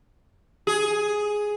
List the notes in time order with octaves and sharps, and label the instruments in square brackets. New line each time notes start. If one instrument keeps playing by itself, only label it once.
[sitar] G#4